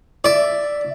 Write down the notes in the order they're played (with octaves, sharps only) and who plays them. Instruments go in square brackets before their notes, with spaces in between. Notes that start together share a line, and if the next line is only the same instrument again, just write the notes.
[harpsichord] D5 [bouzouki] E5